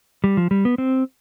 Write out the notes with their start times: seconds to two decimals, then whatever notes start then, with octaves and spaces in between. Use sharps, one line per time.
0.24 G3
0.37 F3
0.51 G3
0.65 B3
0.78 C4